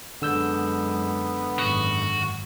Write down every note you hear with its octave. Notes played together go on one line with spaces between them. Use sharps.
F#2 D3 G#3 B3 E6 G6
G#1 F#2 F#4